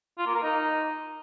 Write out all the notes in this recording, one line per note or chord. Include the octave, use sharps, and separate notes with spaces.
F4
A#3
A#4
D#4